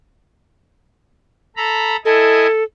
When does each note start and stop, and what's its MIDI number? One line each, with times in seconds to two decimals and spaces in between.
1.57 1.96 69
1.57 1.96 82
1.57 1.96 83
2.05 2.47 64
2.05 2.63 69
2.05 2.47 75
2.05 2.47 80